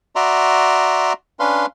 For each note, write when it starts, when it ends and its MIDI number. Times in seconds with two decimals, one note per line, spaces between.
0.16 1.13 66
0.16 1.13 74
0.16 1.13 76
0.16 1.13 82
0.16 1.13 84
1.40 1.66 61
1.40 1.66 62
1.40 1.66 71
1.40 1.66 77
1.40 1.66 84